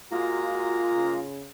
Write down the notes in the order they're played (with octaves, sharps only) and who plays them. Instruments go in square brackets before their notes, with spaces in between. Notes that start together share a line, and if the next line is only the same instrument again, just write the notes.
[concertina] G#3 A#3 A#5 [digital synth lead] F4 [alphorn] F#4
[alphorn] C#3